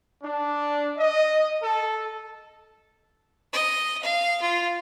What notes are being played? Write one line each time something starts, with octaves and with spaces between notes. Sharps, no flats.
D4
D#5
A4
D#5
F5
F4